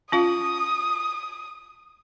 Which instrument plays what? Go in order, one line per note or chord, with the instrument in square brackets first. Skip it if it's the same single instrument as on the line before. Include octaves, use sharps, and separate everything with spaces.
[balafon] C#4 F4 F5 [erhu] D#6